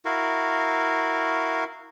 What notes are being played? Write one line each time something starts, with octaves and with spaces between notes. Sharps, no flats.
E4 F#4 A#4 F5